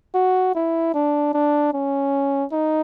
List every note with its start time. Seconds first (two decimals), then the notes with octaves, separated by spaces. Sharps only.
0.15 F#4
0.55 E4
0.94 D4
1.33 D4
1.73 C#4
2.52 D#4